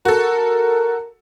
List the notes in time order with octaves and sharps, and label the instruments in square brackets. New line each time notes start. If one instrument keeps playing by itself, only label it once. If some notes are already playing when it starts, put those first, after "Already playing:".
[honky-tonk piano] F#4 A4 [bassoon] A#4